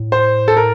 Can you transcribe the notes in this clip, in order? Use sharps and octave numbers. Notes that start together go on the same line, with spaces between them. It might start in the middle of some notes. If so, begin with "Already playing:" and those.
Already playing: A2
C5
A4
A#4